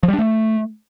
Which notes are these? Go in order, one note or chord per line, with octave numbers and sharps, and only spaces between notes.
F3
G3
D4
A3